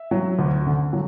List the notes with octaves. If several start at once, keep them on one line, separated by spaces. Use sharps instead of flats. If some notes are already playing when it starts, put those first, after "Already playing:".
Already playing: E5
F#3
D2
D3
F#3